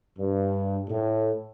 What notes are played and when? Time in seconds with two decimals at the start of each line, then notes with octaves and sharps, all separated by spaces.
0.18 G2
0.89 A2